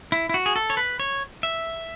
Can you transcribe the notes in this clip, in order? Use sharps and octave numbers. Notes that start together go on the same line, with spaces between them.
E4
E4
F#4
G#4
A4
C#5
B4
C#5
E5